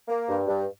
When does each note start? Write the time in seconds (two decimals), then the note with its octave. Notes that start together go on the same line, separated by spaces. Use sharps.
0.08 A#3
0.28 G2
0.48 G2